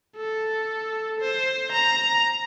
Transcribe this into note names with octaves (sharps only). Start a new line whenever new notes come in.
A4
C5
A#5